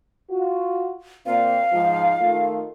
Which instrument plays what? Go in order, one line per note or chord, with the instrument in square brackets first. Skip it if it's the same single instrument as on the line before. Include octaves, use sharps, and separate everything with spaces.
[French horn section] F4 F#4
[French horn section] A#2 C4 [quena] F5
[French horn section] G#2 F3
D#3 A3 F4